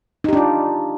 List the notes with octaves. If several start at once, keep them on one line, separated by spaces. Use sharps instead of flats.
D4 D#4 F4 G4